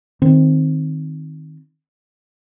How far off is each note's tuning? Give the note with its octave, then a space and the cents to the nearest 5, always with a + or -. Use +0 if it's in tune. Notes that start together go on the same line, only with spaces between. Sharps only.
D#3 +0 C4 +0